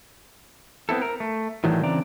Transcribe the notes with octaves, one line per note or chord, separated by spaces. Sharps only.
B3 C4 E4 A4
A#4
A3
A2 D#3 E3 F#3 G3 A3
C#3 E3 C4 D4 D5 A#5